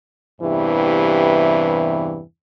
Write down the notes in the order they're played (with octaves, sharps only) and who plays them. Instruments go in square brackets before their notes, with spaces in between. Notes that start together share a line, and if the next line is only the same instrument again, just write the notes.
[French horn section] E2 G2 C3 E3